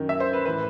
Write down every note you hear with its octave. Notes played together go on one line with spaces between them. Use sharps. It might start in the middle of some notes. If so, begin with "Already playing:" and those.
Already playing: F#2 D#3
E5
C5
B4
A2 E3 B4